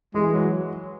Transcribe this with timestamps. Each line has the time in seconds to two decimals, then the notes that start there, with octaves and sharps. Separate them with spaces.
0.14 E3 G#3
0.33 F#3